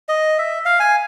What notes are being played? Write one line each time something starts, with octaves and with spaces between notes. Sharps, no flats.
D#5
E5
F5
G#5